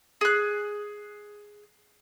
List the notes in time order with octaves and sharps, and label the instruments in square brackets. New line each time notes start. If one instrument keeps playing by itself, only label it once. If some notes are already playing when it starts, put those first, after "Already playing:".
[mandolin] G#4 F#6